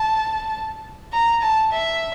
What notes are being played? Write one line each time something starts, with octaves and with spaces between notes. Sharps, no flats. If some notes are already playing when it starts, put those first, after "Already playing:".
Already playing: A5
A#5
A5
E5